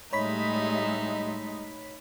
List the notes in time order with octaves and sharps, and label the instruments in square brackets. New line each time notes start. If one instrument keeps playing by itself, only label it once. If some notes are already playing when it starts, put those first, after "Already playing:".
[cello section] A2 G3 E5 [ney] G#3 [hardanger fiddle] D#4 [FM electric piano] C#5 B5 B6